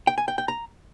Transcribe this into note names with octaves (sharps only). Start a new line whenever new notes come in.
G5
G#5
G5
G5
A#5